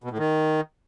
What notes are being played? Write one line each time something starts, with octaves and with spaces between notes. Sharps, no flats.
B2
A2
D#3